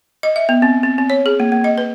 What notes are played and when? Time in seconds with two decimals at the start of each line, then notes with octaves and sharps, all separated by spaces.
0.23 D#5
0.36 E5
0.49 B3
0.62 C4
0.83 C4
0.98 C4
1.10 C#5
1.26 G#4
1.40 A#3
1.52 A#3
1.64 D#5
1.78 B4